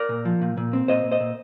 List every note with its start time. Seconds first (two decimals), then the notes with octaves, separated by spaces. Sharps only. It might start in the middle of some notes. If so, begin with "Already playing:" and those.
Already playing: A#4 D5
0.09 A#2
0.25 F3
0.42 A#2
0.57 A#2
0.73 C4
0.88 A#2 C5 D#5
1.04 A#2
1.12 C5 D#5
1.20 A#2